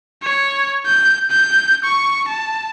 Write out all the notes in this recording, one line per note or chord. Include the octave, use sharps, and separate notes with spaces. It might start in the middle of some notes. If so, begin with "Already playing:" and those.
C#5
G6
G6
C#6
A5